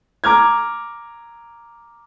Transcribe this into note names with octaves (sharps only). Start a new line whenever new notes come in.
A#5 D6 F6 G#6